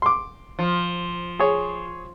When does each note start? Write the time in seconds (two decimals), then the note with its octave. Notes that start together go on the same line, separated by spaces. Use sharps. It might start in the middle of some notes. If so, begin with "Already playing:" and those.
0.02 C6 D6
0.59 F3
1.39 G#4 C#5